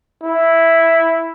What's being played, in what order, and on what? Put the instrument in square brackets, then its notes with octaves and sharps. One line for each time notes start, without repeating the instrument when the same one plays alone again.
[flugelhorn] E4